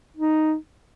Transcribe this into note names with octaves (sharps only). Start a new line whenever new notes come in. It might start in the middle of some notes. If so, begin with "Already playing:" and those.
D#4